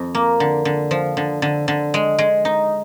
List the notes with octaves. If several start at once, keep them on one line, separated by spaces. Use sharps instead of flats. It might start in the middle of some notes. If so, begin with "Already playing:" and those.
Already playing: F2
A#3
D3
D3
F3
D3
D3
D3
G#3
G#3
D#4